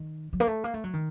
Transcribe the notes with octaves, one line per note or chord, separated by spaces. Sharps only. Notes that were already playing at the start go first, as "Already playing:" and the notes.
Already playing: D#3
F#3
A#3
A3
A#3
A3
F#3
D#3